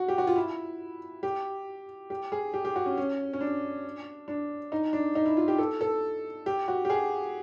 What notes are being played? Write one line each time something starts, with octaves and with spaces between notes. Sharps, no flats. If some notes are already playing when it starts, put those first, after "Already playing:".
Already playing: F#4
G4
F#4
F4
E4
G4
G4
G#4
G4
G4
F#4
C#4
C#4
C#4
D4
D4
D#4
D4
D#4
E4
F4
G4
A4
A4
G4
F#4
G4
G#4